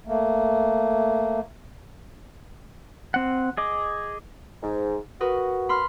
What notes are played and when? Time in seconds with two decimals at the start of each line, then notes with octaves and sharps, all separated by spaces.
0.07 A3 A#3
3.14 C4 F#5
3.57 G#4 D#5 D6
4.63 G#2
5.20 F#4 A#4 B4 D#6
5.69 B5 C6 F6